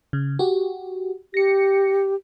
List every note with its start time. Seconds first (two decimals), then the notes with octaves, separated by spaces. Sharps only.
0.13 C#3
0.39 F#4 G4
1.34 G4 A#6 C#7